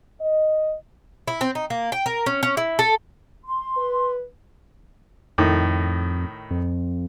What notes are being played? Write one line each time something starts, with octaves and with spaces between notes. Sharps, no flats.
D#5
E4
C4
D#4
A#3
G5
A#4
C#4
C#4
E4
A4
C6
B4
F2 A2 D#3
F2